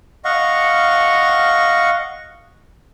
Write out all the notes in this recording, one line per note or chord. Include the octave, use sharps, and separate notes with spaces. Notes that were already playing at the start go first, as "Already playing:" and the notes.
D#5 F5 F#5 C#6